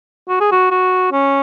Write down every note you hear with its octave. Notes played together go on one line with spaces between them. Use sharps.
F#4
G#4
F#4
F#4
C#4